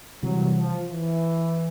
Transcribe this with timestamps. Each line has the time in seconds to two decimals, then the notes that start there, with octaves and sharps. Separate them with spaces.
0.23 C3 E3 F#3 G3
0.57 F3
0.91 E3